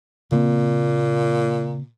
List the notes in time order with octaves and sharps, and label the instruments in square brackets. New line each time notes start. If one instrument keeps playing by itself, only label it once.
[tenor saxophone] A#2 [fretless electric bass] C#3 A#3 C4